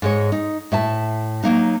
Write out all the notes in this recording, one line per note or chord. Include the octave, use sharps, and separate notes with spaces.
G#2 G#3 C#5
D#4
A2 E5 A5
F#3 A#3 D#4